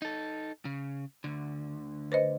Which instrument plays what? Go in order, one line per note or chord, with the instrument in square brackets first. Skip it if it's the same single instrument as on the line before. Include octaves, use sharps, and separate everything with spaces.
[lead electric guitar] D#4 A4
C#3
D2 D3
[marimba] B4 C5 D#5